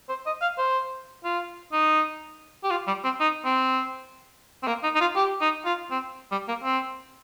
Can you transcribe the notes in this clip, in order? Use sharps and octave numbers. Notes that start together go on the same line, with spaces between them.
C5
D#5
F5
C5
F4
D#4
G4
F4
G3
C4
D#4
C4
C4
A#3
D#4
D#4
F4
G4
D#4
F4
C4
G3
A#3
C4